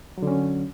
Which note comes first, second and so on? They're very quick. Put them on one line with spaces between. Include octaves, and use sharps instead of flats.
F#3 D3 C#4